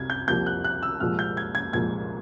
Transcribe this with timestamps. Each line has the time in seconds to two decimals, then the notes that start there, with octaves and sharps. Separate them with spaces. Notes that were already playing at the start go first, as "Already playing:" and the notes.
Already playing: C2 C3 G#6
0.10 G6
0.28 C2 C3 F3 A#3 G6
0.46 F#6
0.64 F#6
0.83 E6
1.00 C2 A#2 F3 G#3 F6
1.19 G6
1.37 G#6
1.55 G#6
1.73 C2 A#2 F3 G#3 G#6